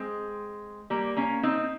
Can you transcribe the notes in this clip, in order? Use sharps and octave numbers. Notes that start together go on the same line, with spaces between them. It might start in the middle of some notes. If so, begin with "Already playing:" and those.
Already playing: G#3 C4
G3 A#3
A#3 C#4
C4 D#4